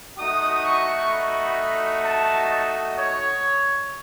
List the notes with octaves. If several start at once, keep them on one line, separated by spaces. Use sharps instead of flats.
A3 D#4 F#4 D#6
C#6
B5
A5
D#5
C#5